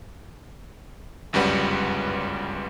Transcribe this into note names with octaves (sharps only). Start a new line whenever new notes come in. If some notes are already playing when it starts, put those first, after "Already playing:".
G1 C#2 F#2 G3 B4 F#5